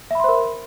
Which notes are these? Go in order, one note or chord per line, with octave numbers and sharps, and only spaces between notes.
A#4 C5 E5 B5 C6